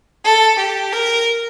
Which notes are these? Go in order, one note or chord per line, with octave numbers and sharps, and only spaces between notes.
A4
G4
A#4